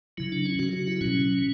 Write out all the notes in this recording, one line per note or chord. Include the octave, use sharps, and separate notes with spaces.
C#3 F#3 E4
D4
C#4
C#3 F#3 F#4
F#4
E4
B2 F#3 C#4